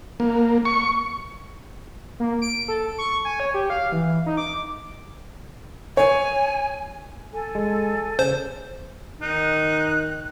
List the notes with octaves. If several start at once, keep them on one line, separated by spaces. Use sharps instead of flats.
A#3
C#6
A#3
D7
A4
C#6
G#5
C#5
G4
F5
E3
D#4
D6
C#5 G#5
A4 G#5
G#3
C#3 C5
D#3 D#4 F#6